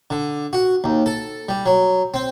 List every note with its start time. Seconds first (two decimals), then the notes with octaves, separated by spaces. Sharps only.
0.10 D3
0.53 F#4
0.84 D#2
1.06 A4
1.49 G3
1.66 F#3
2.14 C4